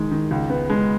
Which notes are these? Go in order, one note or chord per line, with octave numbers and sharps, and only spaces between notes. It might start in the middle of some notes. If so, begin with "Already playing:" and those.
Already playing: D#3 G#3
D#3
C#2
B3
G#3